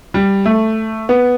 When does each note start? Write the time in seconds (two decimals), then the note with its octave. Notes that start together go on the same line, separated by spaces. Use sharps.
0.14 G3
0.46 A3
1.09 B3